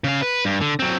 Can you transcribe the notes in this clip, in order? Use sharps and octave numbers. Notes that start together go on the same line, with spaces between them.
C#3 F5
B4
G2
D3
F#3 C4